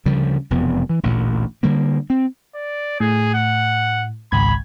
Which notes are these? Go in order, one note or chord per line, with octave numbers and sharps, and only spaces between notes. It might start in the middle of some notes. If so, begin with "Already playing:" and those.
D2 C#3 F3 G3
E1 F2 C3 B3
E3
A1 D2 A#2
D3 G3 A#3
C4
D5
A2 G#4
F#5
G#1 C#2 B5 G#6